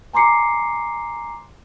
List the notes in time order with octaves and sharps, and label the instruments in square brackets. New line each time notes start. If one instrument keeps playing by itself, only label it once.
[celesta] G#5 A#5 C6 D6 C7 C#7